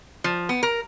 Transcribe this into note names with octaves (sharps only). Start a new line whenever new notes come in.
F3
B3
A#4